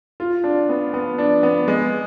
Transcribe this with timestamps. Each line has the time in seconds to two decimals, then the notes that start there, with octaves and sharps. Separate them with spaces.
0.20 F4
0.44 D4
0.69 B3
0.94 B3
1.18 D4
1.43 B3
1.68 G#3